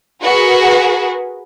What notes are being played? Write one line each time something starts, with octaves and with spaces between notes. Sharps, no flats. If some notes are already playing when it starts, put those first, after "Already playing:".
F#4 G#4 A#4 B4